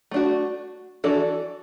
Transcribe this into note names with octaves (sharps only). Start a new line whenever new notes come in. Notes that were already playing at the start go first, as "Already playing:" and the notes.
A3 D4 F#4
E3 D4 F#4 A4 D5